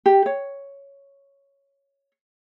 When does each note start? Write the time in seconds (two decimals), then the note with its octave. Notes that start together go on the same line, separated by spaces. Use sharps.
0.06 G4
0.26 C#5